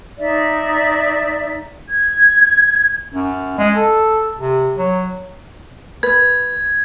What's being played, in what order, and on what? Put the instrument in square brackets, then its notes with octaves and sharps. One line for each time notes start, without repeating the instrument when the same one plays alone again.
[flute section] D#4 D5 E5
G#6
[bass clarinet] F#2
G#3
A4
C3
F#3
[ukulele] B4 [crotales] G#6